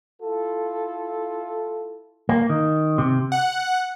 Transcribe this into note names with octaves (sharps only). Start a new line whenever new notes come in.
E4 F4 A4
A#3
D#3
C3
F#5